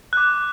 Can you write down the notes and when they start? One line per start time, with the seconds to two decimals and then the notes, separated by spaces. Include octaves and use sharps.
0.13 D6 F#6